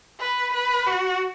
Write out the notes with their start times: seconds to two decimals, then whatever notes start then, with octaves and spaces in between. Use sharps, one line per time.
0.20 B4
0.53 B4
0.86 F#4